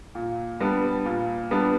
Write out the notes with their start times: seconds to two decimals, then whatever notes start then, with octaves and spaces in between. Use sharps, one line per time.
0.15 A#2
0.60 G3 B3 D4
1.05 A#2
1.51 G3 B3 D4